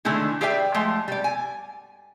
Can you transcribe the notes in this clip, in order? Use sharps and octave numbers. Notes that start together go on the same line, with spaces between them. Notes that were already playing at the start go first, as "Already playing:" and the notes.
D3 D#3 G#3 A3 E4 G#4
G4 G#4 B4 D5 E5 G5
F3 G#3 A3
G3 D5
G#5